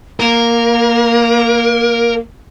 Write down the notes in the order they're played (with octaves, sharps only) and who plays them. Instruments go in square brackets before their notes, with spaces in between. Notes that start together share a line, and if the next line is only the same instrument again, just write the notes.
[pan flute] A#3 [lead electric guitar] A#4